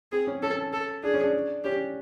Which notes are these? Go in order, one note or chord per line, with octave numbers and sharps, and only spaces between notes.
C4 G#4
C#4
C#4 A4
A4
D4 G#4
C#4
D4
C#4 G4